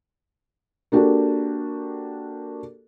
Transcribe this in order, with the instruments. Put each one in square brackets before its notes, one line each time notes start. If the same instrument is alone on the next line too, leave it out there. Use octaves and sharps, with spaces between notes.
[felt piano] A#3 D4 F#4 G4 A4